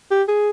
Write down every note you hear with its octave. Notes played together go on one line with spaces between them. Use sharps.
G4
G#4